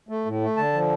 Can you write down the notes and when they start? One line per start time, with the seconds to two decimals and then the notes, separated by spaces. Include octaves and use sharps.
0.09 A3
0.26 A2
0.41 A3
0.57 D3 A5
0.73 F3